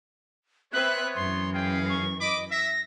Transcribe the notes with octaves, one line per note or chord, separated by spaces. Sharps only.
B3 C4 B4 C#5 E5 F#6
F#2 E3 C6
C#4 G#4 F5 G5
C#6
D#5 B5 D6
E5 A#6